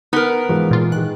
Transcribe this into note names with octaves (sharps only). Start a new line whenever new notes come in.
B3 D#4 A#4
G#2 E3 F3 G#3
A#2 F4
D#3 G#3 F#6